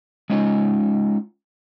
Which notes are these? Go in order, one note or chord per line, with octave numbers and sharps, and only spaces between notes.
G#3 C#4 D#4 F4